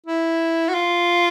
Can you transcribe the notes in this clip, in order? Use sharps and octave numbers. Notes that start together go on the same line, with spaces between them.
E4
F#4
F4